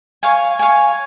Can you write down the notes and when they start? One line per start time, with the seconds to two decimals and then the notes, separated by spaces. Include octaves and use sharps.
0.23 C#5 F5 G#5
0.59 C#5 F5 G#5